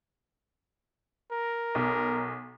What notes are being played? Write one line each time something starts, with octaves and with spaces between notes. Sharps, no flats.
A#4
B1